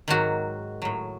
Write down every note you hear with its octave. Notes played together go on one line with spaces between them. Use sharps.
G#2 D#3 F#3 F#4
A2 F#3